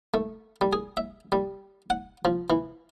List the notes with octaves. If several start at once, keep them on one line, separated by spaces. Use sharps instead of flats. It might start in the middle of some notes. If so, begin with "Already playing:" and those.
A3
G3
G#4
E5
G3
F#5
F3
E3